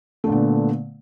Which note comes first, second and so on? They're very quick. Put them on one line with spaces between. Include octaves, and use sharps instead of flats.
A3 D3 A#2 B3